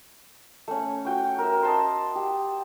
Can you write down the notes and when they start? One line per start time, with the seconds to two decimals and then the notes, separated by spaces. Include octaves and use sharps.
0.68 A3 C#4
1.05 F#4 G5 C#6
1.38 A#4 E5
1.63 D#5 A5 C6
2.15 G4